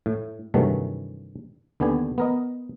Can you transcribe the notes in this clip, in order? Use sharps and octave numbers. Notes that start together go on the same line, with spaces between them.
A2
G2 C3 D#3 E3 F#3 A3
D#2 D3 B3 G4 G#5
B3 A#4 D#5